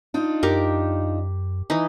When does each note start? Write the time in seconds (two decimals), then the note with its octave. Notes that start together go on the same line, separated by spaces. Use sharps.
0.14 D4 D#4 F4
0.43 F#2 G4 A#4
1.70 E3 D#4